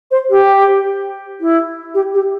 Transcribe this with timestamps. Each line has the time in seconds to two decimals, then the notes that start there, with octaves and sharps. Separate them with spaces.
0.11 C5
0.30 G4
1.40 E4
1.94 G4
2.14 G4